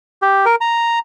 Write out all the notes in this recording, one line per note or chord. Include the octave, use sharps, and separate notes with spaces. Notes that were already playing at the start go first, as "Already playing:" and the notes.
G4
A#4
A#5